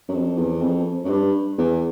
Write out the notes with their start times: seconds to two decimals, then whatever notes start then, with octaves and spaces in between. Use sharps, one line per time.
0.09 F#2
0.14 F2
0.38 E2
0.62 F2
1.04 F#2
1.09 G2
1.58 E2